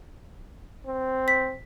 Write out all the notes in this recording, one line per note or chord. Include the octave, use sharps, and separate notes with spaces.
C4
B6